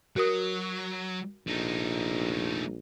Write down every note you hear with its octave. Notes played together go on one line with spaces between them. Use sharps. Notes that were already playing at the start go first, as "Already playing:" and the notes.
F#3 F#4 A#4 D#6
A#1 A3 D#4